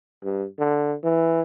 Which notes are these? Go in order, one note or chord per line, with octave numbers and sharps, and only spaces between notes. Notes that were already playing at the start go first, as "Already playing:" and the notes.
G2
D3
E3